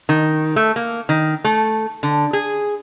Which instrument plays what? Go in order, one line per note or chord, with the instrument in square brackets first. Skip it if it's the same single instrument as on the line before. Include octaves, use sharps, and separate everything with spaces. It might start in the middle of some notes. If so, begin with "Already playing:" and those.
[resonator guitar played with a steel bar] D#3
A3
A#3
D#3
A3
D3
G#4